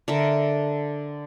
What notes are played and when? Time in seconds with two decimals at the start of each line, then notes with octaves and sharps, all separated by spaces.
0.08 D3 A#4 E5